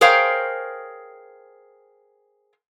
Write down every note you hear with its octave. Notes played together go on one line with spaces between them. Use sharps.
G#4 A#4 C5 C#5 F5 G5